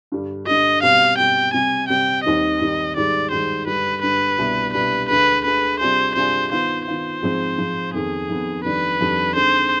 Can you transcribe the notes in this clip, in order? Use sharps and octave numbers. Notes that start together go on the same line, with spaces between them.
G2 D3 G3
G2 D3 G3 D#5
B2 G3 C4 F5
B2 G3 C4 G5
C3 G3 C4 G#5
C3 G3 C4 G5
D#2 D#3 G3 C4 D#4 D#5
D#2 D#3 G3 C4 D#4
G#2 D#3 G3 D5
G#2 D#3 G3 C5
G2 D3 G3 B4
G2 D3 G3 B4
C2 B2 G3 D4
C2 B2 G3 D4 B4
D2 D3 G#3 B4
D2 D3 G#3 B4
C3 G3 D4 F4 G#4 C5
C3 G3 D4 F4 G#4 C5
D#3 B3 F4 C5
D#3 B3 F4 C5
G#2 F3 C4
G#2 F3 C4
F2 D#3 B3 G#4
F2 D#3 B3
F2 D#3 G3 D4 B4
F2 D#3 G3 D4
D3 G#3 C4 D#4 C5